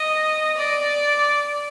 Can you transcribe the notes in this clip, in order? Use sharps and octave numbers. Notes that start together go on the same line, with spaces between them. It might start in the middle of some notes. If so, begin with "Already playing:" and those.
Already playing: D#5
D5